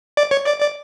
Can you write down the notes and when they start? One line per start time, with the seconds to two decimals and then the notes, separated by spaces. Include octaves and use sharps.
0.17 D5
0.31 C#5
0.46 D5
0.60 D5